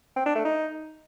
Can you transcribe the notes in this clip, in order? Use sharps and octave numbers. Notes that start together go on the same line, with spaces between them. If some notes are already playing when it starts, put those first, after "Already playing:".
C4
D4
A3
D#4